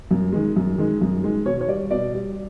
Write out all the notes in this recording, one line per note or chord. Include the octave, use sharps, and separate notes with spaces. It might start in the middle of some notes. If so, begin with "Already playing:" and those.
F#2
D#3 G#3
F#2
D#3 G#3
F#2
D#3 G#3
B2 C#5
C#5
G3 D5
B2 D5
G3